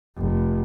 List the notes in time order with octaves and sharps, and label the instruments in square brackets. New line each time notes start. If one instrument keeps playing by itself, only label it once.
[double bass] F1